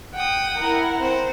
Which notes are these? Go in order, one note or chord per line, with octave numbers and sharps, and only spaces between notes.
F#5 G5 D#6
E4 A#4
C4 C5